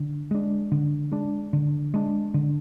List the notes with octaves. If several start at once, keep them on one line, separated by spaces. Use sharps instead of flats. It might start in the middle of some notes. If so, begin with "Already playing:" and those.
Already playing: D3
G#3 D4
D3
G#3 D4
D3
G#3 D4
D3